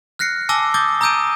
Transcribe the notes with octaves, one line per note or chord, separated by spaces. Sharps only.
F6 F#6 A#6 C7 C#7
G#5 A5 D6 E6 A#6 G7
D6 D#6 G6 A6 G7
A#5 D#6 E6 G6 D7 D#7